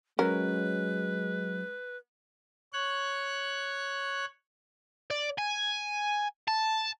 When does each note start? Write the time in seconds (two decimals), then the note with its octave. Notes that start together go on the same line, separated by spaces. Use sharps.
0.19 F#3 G#3 C#4 A#4 B4
2.73 C#5 F#6
5.10 D5
5.38 G#5
6.48 A5